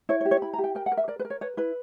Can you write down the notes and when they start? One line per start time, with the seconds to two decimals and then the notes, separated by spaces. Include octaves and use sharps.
0.09 E4 C#5
0.21 C#5
0.25 G4
0.31 C#5
0.42 E4 B5
0.54 A#5
0.58 G4
0.64 G5
0.75 A#4 G5
0.86 F#5
0.92 A#4
0.97 E5
1.08 A#4 D5
1.19 B4
1.25 A#4
1.30 C#5
1.41 B4 C#5
1.57 E4 B4